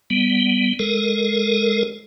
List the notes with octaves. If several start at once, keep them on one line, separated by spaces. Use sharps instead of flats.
G3 B3
G#3 A4 A#4